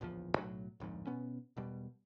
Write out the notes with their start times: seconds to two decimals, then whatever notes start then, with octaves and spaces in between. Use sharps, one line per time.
0.01 D1 A#1 E2 F3
0.35 B1 A2 F#3
0.80 D1 A#1 F2 G#2
1.07 B2 B3 C#4
1.57 E1 B2 G3